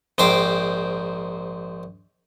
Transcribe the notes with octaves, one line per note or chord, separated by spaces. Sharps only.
A#1 G#2 C5 G5 D6